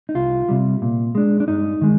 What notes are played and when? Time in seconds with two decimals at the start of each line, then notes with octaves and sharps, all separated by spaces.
0.09 D#4
0.15 C2 F4
0.49 C3 G3
0.82 A#2
1.15 G#3 D4
1.40 D4
1.48 G2 D#4
1.81 D#3 G#3